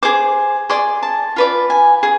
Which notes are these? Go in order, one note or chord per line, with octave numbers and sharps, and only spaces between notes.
G#4 C5 D6
G#4 D5 C6
A5
F4 B4 D5
G#5
G#4